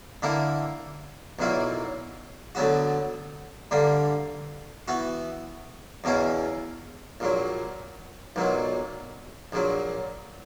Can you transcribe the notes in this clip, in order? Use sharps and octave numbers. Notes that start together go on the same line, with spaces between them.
D3 A#3 E4
B1 A#2 F#3 A#3 E4
D2 D3 F#3 B3 F#4
G2 D3 A#3
E3 B3 F#4
E2 B2 A#3 C#4 E4
A#1 A#2 F#3
B1 A#2 F#3
A#1 A#2 F#3